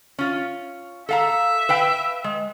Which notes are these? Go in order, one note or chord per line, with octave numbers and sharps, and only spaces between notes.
C#4 F4
A4 E5 F5 A#5
B4 F5 G5
G#3